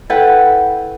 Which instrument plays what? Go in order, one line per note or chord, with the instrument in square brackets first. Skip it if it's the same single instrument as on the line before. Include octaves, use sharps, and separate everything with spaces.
[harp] E4 A4 B4 F#5 G5